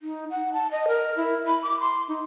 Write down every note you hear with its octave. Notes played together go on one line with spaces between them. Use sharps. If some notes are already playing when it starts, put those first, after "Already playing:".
D#4
F#5
A5
D#5
A#4
E4
B5
D6
C6
D#4